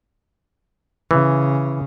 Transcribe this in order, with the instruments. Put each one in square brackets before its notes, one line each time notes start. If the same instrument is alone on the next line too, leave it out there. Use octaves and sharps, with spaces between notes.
[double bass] C#3 [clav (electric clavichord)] E3